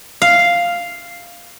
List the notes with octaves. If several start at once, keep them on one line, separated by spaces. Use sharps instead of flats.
F5